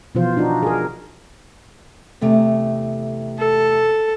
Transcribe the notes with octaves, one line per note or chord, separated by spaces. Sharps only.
B2 E3 F3 F4 C5
D4 D#4 F#4
G#4 A#4
E2 C3 A3
A4